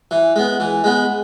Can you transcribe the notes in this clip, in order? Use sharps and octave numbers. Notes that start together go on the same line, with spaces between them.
E3
G#3 B3
E3
G#3 B3